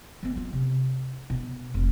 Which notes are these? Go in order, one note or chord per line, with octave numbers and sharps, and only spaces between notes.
F3 B3
F#3 F4
C3
B2
F1